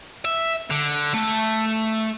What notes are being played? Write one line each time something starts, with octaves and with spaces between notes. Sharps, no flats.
E5
D3
A3